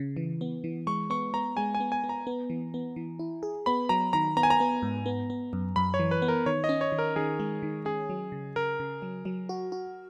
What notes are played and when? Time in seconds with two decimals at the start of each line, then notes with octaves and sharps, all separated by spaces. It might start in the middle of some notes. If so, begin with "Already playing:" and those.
Already playing: C#3
0.17 E3
0.41 B3
0.64 E3
0.87 G#3 C#6
1.10 B3 C#6
1.34 B3 A#5
1.57 G#3 G#5
1.75 G#5
1.80 B3
1.92 G#5
2.04 B3
2.09 A#5
2.27 B3
2.50 E3
2.74 B3
2.96 E3
3.19 E4
3.43 G#4
3.66 B3 B5
3.89 F#3 A#5
4.13 D#3 A#5
4.37 B3 A#5
4.43 G#5
4.50 A#5
4.60 B3
4.83 G#2
5.06 B3
5.30 B3
5.53 F#2
5.76 F#2 B5
5.94 C#5
5.99 E3
6.11 B4
6.22 B3
6.28 A#4
6.46 D#3 C#5
6.64 D#5
6.69 C#4
6.81 C#5
6.92 D#3
6.99 A#4
7.16 D#3 G#4
7.39 G#3
7.63 D#3
7.85 C#4 G#4
8.10 F#3
8.32 C#3
8.56 C#3 A#4
8.80 C#3
9.02 F#3
9.25 F#3
9.49 F#4
9.72 F#4